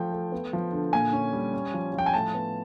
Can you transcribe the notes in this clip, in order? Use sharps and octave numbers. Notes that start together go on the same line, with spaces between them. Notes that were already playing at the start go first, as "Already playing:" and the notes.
Already playing: F3 A3 G5
A3
B3
F3
D3
A#2 G#5
C#4
G3
C#4
F3
F3 G5
G#5
A2 A5
B3